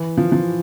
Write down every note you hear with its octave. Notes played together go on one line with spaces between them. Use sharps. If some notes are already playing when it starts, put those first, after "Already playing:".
Already playing: E3
F3
F3